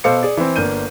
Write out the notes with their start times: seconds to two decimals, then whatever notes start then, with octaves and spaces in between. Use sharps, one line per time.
0.04 B2 A4 C5 F5 D6 C#7
0.23 G#4 D5
0.37 E3 C4
0.56 G1 A#3 D4 G6 D#7